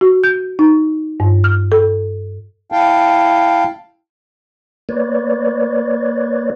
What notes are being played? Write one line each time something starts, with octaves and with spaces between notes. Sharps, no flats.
F#4
G6
D#4
G2
F6
A4
E4 F5 G5 A5
A#3 B4 C#5 D5